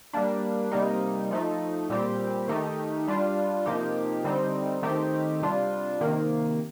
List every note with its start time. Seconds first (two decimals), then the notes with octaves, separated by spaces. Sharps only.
0.13 G3 A#3 D4
0.71 C3 G3 A#3 D#4
1.31 F3 A3 D#4
1.90 A#2 G3 C4 G4
2.48 D#3 A3 D#4 G4
3.08 G3 D4 F4
3.66 C3 F3 A#3 D#4 G4
4.24 D3 G3 C4 D#4
4.83 D#3 A3 C4 D#4 G4
5.42 C3 G3 D4 F4
6.01 C3 D#3 A#3